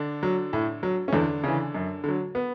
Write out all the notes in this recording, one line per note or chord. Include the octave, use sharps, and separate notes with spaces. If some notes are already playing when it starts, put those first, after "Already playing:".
Already playing: D3 D4
F#3
A2
F#3
C#4
E2 D3 D4
C#3 E3
F#2
D3 F#3
B3